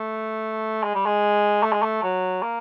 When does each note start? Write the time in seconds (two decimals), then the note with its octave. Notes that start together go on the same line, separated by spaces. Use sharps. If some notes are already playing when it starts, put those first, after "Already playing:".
Already playing: A3
0.84 G#3
0.95 G3
1.06 G#3
1.63 A3
1.73 G#3
1.83 A3
2.03 F#3
2.43 A#3